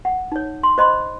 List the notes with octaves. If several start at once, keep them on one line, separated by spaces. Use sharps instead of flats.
F#5
D#4 C#5
C6
C5 D#5 B5 C6